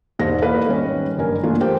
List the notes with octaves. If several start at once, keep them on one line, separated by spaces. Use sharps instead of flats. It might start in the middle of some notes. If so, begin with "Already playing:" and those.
E1 G#2 G4 C5 F5 A#6
A#3 E4 B4 D5 D#5 F5
G#1 G3 C#4
F#1 G2 A#4 G#5
E3 A3 A#3 D4 F4
G4 A4 A#4 C5 G5